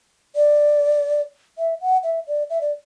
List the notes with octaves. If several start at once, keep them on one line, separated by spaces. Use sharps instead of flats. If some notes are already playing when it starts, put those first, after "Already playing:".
D5
E5
F#5
E5
D5
E5
D5